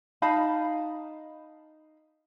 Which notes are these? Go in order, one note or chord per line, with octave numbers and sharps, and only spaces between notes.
D#4 F5 A5 B5